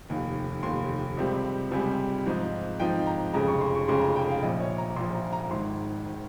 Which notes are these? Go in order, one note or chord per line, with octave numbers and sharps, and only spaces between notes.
F1 D#2 D#3
F1 D#2 D#3 C6
C#2 C3 G3 C4
C#2 C3 G3 C4 G#5
G#2 F3 C4 D#4
G#2 F3 C4 D#4 G5
A#5
F1 F2 C#3 G#3 A#5
C#6
C6
C#6
F1 F2 C#3 G#3 C6
A#5
G5
F5
A#1 A#2 F3 D#5
C#5
A#5
A#1 A#2 F3 C6
A#5
A#5
G#1 G#2 D#3 C6
D#3